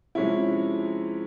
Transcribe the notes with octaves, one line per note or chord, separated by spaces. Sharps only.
C3 F3 G#3 C#4 E4